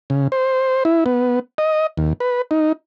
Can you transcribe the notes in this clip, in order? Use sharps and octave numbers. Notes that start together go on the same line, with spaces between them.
C#3
C5
E4
B3
D#5
D#2
B4
D#4